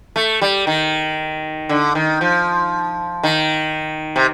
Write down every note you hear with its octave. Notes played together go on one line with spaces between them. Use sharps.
A3
G3
D#3
D3
D#3
F3
D#3
C3